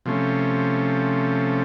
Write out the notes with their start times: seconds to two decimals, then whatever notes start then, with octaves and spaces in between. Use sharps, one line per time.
0.06 C3 F3 A3 C#4